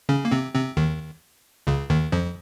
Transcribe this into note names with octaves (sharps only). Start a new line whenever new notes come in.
C#3 C#4
A#3
C3 C4
C3 C4
D#2 D#3
C#2 C#3
D#2 D#3
F2 F3